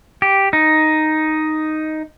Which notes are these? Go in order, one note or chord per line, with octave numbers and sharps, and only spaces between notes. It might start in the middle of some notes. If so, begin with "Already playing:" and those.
G4
D#4